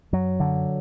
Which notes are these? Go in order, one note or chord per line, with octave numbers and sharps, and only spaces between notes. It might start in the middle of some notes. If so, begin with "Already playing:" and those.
F#2 F#3
D3